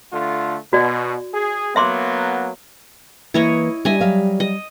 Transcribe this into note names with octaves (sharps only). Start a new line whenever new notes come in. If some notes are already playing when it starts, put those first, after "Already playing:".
D3 A3 F4
B2 F#4 D5
G#4
F#3 A#3 B3 E5 C6 D6
E3 A#3 E4 B4 C#5 D#5
G3 D4 D#5 E5 G#5
F#3 E5 F5
D#5